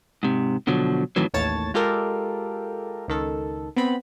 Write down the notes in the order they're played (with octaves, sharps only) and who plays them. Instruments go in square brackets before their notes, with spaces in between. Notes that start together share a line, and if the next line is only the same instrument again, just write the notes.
[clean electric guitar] G#2 C3
B2 D3 F3 F#3
F2 A2 D#3 E3 F#3
[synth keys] A1 D#2 A2 C#5 A5 A6
G#3 F4 G4 A4 A#4
C#2 D#3 A4
B3 C4 B5